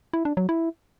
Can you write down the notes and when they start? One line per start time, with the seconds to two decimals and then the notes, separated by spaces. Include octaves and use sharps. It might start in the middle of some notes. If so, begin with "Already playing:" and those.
0.13 E4
0.25 D4
0.37 F#3
0.49 E4